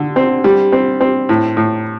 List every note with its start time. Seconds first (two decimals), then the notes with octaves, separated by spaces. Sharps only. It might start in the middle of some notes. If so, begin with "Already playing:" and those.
Already playing: D3
0.16 C4
0.44 G3
0.72 C4
1.01 C4
1.29 A2
1.57 A2